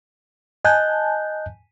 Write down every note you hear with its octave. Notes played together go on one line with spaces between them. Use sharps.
D#5 G#5 A5 F#6 G6